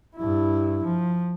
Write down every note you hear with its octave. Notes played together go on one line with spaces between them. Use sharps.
G2 E4
F3